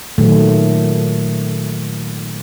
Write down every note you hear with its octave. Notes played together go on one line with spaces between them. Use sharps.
A#2 D#3 F#3 A3